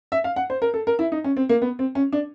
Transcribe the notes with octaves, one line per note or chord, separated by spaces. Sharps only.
E5
F5
F#5
C5
A#4
A4
A#4
E4
D#4
C#4
C4
A#3
B3
C4
C#4
D4